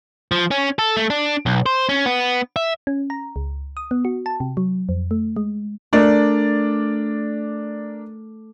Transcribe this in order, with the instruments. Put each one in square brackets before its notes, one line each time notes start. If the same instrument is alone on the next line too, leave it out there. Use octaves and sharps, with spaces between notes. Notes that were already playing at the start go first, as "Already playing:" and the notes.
[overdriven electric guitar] F3
C#4
A4
A3
D4
B1
C5
C#4
B3
E5
[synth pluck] C#4
A#5
C#2
D#6
B3
F#4
A5
C3
F#3
F2
A3
G#3
[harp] A3 [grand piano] D4 A#4 D5